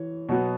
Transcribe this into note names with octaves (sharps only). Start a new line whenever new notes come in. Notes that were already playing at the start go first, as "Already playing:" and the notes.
Already playing: E3 C#5
B2 F#3 B3